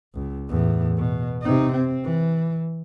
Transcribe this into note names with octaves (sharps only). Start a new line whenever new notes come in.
C#2
E2 A2
B2
C3 D#4
C4
E3